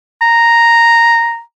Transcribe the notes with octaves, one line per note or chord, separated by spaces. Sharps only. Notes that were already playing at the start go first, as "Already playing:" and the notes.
A#5